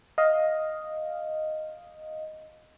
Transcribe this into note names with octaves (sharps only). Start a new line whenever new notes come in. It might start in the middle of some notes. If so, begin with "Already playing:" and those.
D#5 F5